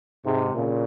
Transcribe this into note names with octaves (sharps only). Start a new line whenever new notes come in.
G#2 C3
A#2 C#3